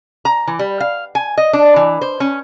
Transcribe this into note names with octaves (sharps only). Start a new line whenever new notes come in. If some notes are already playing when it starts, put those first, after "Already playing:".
A#5
E3
G3
F5
G#5
D#5
D4
E3
C5
C#4